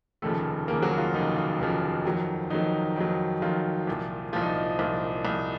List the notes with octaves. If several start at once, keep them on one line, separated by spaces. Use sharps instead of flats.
F1 D#2 C#3 F3 A3 A4
F1 D#2 C#3 F3 A#3 A#4
F#3 F#4
F4
F1 D#2 C#3 F3 D#4
F4
F1 D#2 C#3 F3
F2 D#3 F#3
F2 D#3 F#3 D#4
F2 D#3 F#3
F2 D#3 F#3 F4
C2 A#2 F3
C2 A#2 F3 F4
D#4
D#4
C2 A#2 F3 F4
C2 A#2 F3